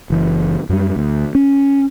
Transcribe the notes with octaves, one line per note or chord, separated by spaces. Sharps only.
F#1 E3
F#2 G3
D2
C#4